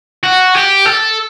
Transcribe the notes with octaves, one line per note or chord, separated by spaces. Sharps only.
F#4
G4
A4